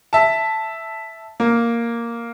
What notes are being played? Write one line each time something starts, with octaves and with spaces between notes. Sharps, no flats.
E5 A5
A#3